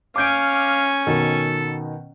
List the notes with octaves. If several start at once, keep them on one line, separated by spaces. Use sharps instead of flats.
C#4 F5 G#5 D6 G6 D7
B2 D#3 A4